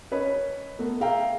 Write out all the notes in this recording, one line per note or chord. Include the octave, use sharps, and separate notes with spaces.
C#4 A#4 B4 C#5 D#5
A3 B3 A#4
G#4 E5 F5 G5 A#5